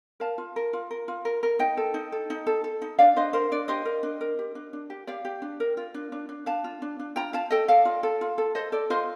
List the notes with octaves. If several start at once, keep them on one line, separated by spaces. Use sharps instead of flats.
A#4 F5 A5
F4
A#4
F4
A#4
F4
A#4
A#4
D#4 D#5 G5
A4
D#4
A4
D#4
A4
A4
D#4
D4 D5 F5
D4 C5 D#5
A#4 C5
D4 D5
G4 C5 D#5
A#4
D4
A#4
G4
D4
D4
G4
G4 D5 F5
G4
D4
A#4
F4
D4
D4
D4
D4 F5 A5
F4
D4
D4
F4 G5 A#5
F4 F5 A5
A4 D#5 G5
A4 D5 F5
F4
A4
F4
A4
A4 C5 D#5
A4 D5
F4 C5 D#5